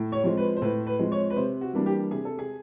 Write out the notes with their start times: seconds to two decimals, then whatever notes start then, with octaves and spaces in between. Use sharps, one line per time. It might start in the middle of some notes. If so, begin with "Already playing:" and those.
Already playing: A2
0.12 C#5
0.24 F3 G#3 C4
0.37 B4
0.56 C5
0.62 A2 B4
0.87 B4
0.99 F3 G#3 C4
1.12 C#5
1.30 B4
1.36 C3 C5
1.61 F#4
1.73 E3 G3 A#3 D4
1.86 G4
2.11 C3 G#4
2.25 A4
2.39 G#4